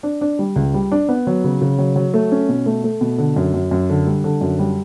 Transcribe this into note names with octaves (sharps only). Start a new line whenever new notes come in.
D4
D4
G3
C#2
G3
D4
B3
F#3
C#3
C#3
F#3
F#3
A3
C#4
B2
A3
A3
B2
D3
F#2
F#2
F#2
D3
G3
D3
F#2
G3